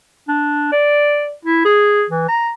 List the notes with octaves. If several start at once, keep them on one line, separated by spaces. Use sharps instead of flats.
D4
D5
E4
G#4
E3
A#5